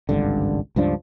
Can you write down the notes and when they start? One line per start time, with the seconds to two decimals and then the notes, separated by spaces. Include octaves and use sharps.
0.09 G#1 C#2 G2 D3
0.76 C#2 G2 F3 D4